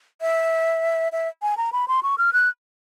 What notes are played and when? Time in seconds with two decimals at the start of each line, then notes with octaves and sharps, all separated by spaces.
0.21 E5
1.12 E5
1.42 G#5
1.57 A#5
1.73 B5
1.88 C6
2.03 C#6
2.18 F6
2.33 F#6